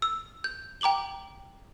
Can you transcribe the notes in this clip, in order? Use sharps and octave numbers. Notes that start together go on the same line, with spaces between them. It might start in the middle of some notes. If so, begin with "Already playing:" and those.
E6
G6
G5 A#5 D6 F#7 G7